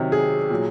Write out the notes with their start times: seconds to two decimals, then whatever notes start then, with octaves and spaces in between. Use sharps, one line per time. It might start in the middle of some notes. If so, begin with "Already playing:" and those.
Already playing: C3 D#3 F#3
0.12 G#4
0.50 A#2 F#3